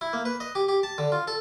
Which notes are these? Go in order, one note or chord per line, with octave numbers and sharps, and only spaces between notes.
E4
A#3
B4
D#5
G4
G4
A5
D3
F4
A4